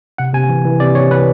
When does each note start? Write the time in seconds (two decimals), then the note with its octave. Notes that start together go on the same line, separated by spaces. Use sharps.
0.18 C3 F#5
0.34 C3 G#5
0.49 E3
0.65 E3
0.80 C3 D5
0.95 C3 C#5
1.11 E3 B4